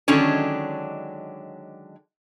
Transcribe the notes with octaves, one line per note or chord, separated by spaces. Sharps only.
D3 D#3 F#3 G#3 C#4 D4